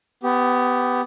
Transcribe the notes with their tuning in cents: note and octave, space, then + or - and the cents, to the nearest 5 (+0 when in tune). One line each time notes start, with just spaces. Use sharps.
B3 +15 G4 -5